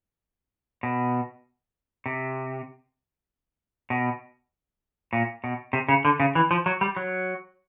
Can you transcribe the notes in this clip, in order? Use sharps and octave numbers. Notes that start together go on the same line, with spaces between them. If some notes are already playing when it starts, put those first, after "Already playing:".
B2
C3
B2
A#2
B2
C3
C#3
D3
C#3
E3
F3
F#3
G3
F#3